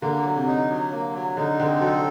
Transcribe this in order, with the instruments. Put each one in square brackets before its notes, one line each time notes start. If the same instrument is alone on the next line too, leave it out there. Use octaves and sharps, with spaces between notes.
[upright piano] D3 [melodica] A#3
[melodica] F#3
[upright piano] C3
[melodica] D#4
F#3
A#3
F#3
[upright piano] D3 [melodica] D#4
[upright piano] D3 [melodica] C4
[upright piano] F#3 [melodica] A4